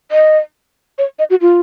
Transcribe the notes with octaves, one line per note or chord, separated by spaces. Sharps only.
D#5
C#5
D#5
F#4
F4